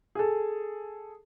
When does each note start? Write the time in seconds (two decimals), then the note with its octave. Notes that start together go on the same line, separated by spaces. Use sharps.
0.15 G#4 A4